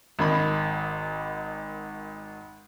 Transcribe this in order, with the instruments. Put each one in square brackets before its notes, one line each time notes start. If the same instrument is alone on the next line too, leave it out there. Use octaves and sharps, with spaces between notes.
[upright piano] G#1 D#3 B5